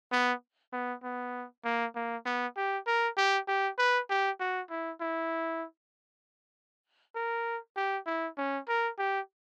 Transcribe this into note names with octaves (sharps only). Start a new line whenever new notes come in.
B3
B3
B3
A#3
A#3
B3
G4
A#4
G4
G4
B4
G4
F#4
E4
E4
A#4
G4
E4
C#4
A#4
G4